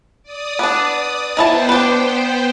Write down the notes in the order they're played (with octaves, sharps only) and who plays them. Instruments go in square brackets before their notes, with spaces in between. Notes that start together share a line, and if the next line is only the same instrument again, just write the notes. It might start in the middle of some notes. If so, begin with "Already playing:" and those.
[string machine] D5 D#6
[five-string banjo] B3 D4
[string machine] B3 C5 G5 [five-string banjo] D#4 E4 A5
[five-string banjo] D4 B4